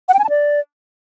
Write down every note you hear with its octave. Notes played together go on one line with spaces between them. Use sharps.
F#5
G5
G#5
A5
D5